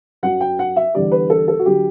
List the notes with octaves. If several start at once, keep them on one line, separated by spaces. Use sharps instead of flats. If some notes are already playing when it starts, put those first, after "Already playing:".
F#2 F#3 F#5
G5
F#5
E5
E2 D3 G3 D5
B4
A4
A4
F#4
D3 F#3 G4